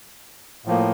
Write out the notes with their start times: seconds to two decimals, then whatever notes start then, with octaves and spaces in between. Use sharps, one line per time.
0.65 A2 F3 A#3